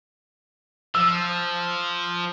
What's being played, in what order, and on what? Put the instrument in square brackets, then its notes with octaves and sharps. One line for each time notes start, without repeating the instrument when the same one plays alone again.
[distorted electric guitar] F3 [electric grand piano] E6